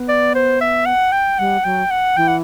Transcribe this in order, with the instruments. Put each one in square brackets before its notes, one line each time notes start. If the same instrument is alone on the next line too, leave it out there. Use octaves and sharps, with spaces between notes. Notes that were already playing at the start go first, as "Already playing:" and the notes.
Already playing: [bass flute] B3
[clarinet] D5
C5
E5
F#5
G5
[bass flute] G3 [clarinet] F#5
[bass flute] F#3 [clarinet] G5
[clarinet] F#5
[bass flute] E3 [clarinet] G5
[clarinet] F#5